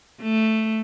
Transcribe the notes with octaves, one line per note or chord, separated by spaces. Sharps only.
A3